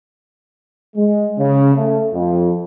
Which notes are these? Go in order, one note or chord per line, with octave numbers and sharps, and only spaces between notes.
G#3
C#3
A3
F2